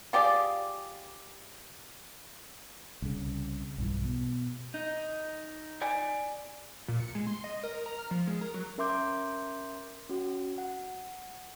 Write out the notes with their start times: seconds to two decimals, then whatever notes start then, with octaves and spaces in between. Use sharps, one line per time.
0.13 F4 G4 G#4 D5
3.02 C2 C#3
3.78 B1 G2 E3
4.05 B2
4.74 D#4
5.82 D5 G#5
6.88 A#2
7.00 C#7
7.15 G#3
7.27 C6
7.44 D#5
7.63 A#4
7.86 A#5
7.99 F6
8.11 F3
8.27 G#3
8.41 A#4
8.54 F#3
8.78 C#4 A#4 E5 C6 D6 G6
10.09 C#4 F#4
10.58 F#5